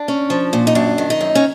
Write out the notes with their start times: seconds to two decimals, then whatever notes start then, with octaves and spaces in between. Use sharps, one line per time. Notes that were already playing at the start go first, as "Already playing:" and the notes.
Already playing: D4
0.08 C#4
0.30 F3
0.53 A#2
0.67 D#4
0.75 F#2 D4
0.98 D#3
1.10 D#4
1.21 F#2
1.35 C#4